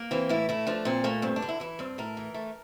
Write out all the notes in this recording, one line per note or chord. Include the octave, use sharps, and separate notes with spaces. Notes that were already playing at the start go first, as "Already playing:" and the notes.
Already playing: A#3
E3 C4
A2 E4
A3 E4
F3 D4
A#2 C4
A3 A#3
G2 C4
D4
D3
E4
E3 E4
G2 C4
A2 A#4
E3
A3